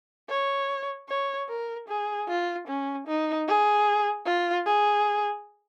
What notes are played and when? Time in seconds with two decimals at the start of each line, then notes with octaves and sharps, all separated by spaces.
0.30 C#5
1.09 C#5
1.49 A#4
1.89 G#4
2.29 F4
2.68 C#4
3.07 D#4
3.48 G#4
4.26 F4
4.66 G#4